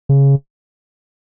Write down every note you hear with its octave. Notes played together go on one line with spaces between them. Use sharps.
C#3